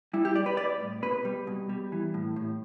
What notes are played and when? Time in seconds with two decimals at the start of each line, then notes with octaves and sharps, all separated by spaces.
0.13 G3 E4
0.25 G4
0.35 G3 D5
0.46 B4
0.57 G3 D5
0.80 A2
1.02 B2 B4
1.25 G3
1.47 B2
1.69 G3
1.92 E3
2.14 A2
2.36 A2